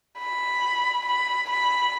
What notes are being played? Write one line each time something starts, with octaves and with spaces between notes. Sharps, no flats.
B5
B5
B5